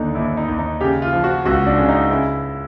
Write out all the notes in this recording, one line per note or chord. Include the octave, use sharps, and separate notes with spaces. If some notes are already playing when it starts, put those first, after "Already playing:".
Already playing: D#2 D3 D4 D#4
D#2 E4
D#4
D#2
D#4
C#3 G4
F4
F3
F#4
C#2 F#4
D4
C#3
D#4
C#3 E4